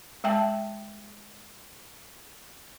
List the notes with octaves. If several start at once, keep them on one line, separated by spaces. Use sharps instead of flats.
G#3 E5 G5 A5